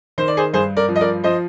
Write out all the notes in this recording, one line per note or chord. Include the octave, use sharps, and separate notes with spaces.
D#3 C5
D5
G#4 C5
G2 G#4 C5
A#4 D5
F3
D#5
A#4 D5
F3 C5 D#5